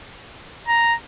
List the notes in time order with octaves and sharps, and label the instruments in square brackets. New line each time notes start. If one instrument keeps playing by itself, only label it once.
[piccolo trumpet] A#5